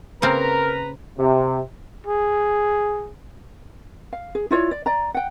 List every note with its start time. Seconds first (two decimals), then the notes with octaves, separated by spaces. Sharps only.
0.22 C#3 A#3 C4 A#4 B4 A#5
1.18 C3
2.07 G#4
4.13 F5
4.35 G#4
4.51 E4 F4 C#5 D5
4.71 D5
4.86 D5 A#5
5.14 F#5 G5